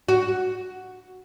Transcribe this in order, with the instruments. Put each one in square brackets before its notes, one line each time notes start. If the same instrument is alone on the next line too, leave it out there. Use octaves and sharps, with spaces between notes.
[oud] F#4